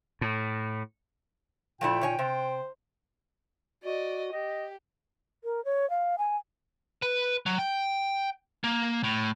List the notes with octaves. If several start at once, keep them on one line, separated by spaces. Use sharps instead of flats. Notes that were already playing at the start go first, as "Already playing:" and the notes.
A2
A#2 F3 A3 E4 G5
D#3 C#5 G#5
C3 C5
F#4 D5 D#5
G4 D#5
A#4
C#5
F5
G#5
B4
F#3
G5
A#3
A2